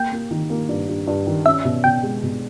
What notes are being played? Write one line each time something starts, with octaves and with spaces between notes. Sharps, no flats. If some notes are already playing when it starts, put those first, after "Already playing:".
Already playing: A#3 G5
A#3
D#3
A#3
G2
G2
G2
D#3
C#4 E5
B2
B2 G5
G#3
B2